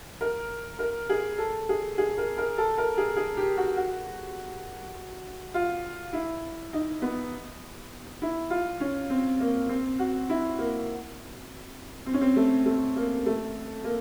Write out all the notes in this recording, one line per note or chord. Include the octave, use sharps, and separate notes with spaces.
A#4
A#4
G#4
A4
G#4
G#4
A#4
A#4
A4
A#4
G#4
G#4
G4
F#4
F#4
F4
E4
D#4
B3
E4
F4
C#4
C4
A#3
C4
F#4
E4
A#3
C4
C#4
C4
A3
A3
A#3
A3
A#3